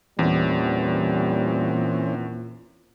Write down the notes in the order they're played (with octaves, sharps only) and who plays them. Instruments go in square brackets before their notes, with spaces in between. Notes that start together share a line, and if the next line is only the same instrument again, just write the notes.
[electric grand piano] E2 [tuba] A#2 [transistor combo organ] E3 C4 C#4 [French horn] G3